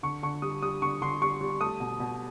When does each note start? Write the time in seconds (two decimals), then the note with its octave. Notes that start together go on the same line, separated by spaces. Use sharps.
0.03 D3 C#6
0.23 D3 C#6
0.42 G3 D#6
0.62 G3 D#6
0.82 D3 C#6
1.02 D3 C6
1.21 G3 C#6
1.41 G3
1.61 A3 D#6
1.80 B2
2.00 B2